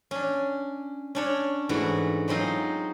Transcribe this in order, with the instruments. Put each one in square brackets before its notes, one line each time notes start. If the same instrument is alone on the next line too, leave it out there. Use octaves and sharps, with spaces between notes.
[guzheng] C#4 D4
C#4 D4 C#5
G#2 E3 A3 F#4
F#3 G#3 C4 D#4 F4